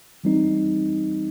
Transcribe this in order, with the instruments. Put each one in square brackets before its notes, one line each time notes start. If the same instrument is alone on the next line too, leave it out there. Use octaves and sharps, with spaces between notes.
[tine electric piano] E3 G3 C4 D#4